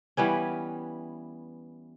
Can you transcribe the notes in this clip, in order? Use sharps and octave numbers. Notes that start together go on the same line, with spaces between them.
E3 G3 B3 C#4